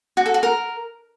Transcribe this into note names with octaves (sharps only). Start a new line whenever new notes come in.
F#4
A4
F#4
A#4